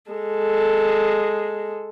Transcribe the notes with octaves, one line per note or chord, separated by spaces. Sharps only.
G#3 A4